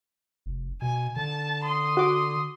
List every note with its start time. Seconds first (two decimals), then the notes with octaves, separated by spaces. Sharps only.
0.46 F1
0.82 B2 G#5
1.16 D3 A5
1.64 C6 D#6
1.97 F#4 D6